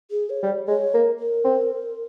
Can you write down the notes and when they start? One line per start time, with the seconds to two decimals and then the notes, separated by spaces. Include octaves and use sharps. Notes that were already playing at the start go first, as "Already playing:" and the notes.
0.11 G#4
0.30 C#5
0.43 G3
0.68 G#3 C#5
0.94 A#3
1.20 A#4
1.44 C4